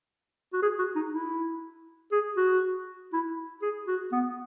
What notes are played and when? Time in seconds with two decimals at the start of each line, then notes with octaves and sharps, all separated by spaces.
0.53 F#4
0.62 G#4
0.79 F#4
0.96 D#4
1.12 E4
2.12 G#4
2.37 F#4
3.13 E4
3.62 G#4
3.88 F#4
4.12 B3